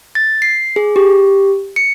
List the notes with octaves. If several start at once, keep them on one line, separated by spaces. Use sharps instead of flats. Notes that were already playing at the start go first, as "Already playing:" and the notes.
A6
C7
G#4
G4
C#7